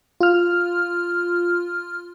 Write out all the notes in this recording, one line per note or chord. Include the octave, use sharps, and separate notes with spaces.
F4 F6